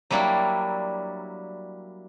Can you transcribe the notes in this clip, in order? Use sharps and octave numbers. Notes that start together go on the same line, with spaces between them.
F#3 G3 A#3 D4 E4